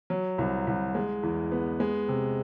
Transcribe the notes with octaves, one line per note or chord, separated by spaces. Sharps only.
F#3
C2
C2
G#3
E2
B3
G#3
C3